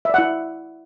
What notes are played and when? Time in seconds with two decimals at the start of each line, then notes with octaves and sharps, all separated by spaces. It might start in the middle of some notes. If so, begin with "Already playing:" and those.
0.05 E5
0.10 D5
0.14 F#5
0.18 E4